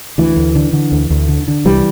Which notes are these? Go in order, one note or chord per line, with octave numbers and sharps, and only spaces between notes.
D2 E3
D2
D3
D3
D2
D2
D3
D3
C2 E3 G3